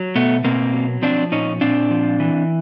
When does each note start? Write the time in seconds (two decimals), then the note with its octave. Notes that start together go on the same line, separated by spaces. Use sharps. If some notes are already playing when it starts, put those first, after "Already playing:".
Already playing: F#3
0.15 B2 A3 B3
0.44 B2 A#3 C4
0.74 F#3
1.02 F3 C4 D4
1.32 A#2 C#4 D#4
1.61 A#2 C4 D4
1.90 F3
2.20 E3